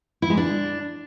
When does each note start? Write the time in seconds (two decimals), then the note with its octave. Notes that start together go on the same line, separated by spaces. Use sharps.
0.22 E4
0.30 G#3
0.37 D4